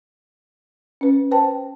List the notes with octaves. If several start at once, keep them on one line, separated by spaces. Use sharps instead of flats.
C#4 B4
B4 C5 G5 A5